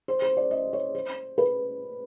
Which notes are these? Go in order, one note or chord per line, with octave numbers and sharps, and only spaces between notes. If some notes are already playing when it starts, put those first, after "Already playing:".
C5
C5
D5
D#5
C#5
C5
B4